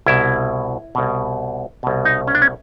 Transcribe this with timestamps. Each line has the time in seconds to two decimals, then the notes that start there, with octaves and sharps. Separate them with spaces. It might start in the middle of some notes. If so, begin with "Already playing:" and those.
0.06 C2 B2 E4
0.95 C2 B2
1.83 C2 B2
2.05 D#4
2.28 C#4
2.35 D4
2.42 C#4